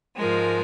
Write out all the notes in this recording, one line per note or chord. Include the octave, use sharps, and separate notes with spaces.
G#2 F3 G#3 A#4